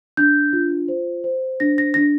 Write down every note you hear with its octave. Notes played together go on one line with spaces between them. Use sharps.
D4 G6
F4
C5
C5
D4 A#6
A#6
D4 A#6